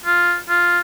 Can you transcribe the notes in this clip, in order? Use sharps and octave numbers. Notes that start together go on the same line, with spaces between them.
F4
F4